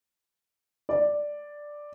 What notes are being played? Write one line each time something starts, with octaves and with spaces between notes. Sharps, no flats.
D5